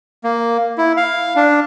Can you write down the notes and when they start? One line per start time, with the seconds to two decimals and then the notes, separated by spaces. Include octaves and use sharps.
0.24 A#3
0.78 E4
0.97 F5
1.36 D4